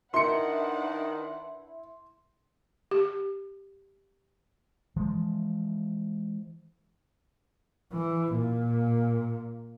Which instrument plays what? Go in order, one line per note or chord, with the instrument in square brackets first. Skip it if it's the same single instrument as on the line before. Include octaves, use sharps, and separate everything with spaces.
[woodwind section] D#3 [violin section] D4 B4 F#5 [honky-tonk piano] E4 [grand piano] C6 C#7
[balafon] G4
[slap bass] E3 F3 G#3
[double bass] E3
A#2